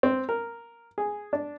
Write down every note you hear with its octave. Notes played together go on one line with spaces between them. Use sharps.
C4
A#4
G#4
D4